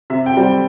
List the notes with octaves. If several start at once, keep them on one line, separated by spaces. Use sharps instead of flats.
C3 E5
G5
G3 C4
G5